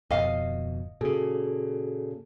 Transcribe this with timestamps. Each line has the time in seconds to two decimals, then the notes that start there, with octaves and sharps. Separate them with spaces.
0.11 D1 F2 B2 D#5 F5
1.01 A#2 C#3 F#4 G#4 A4